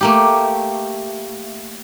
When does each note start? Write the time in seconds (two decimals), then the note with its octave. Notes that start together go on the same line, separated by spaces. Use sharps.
0.01 A3 A#3 G4